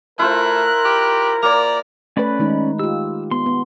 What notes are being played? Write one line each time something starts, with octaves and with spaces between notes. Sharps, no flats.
A3 E4 F4 A#4 C5 F#6
G4
A#3 D5 A#5
A3 C#4 B4 D5 B5
D#3 G#3 D#4
F4 G4 E6
B3 C6
B3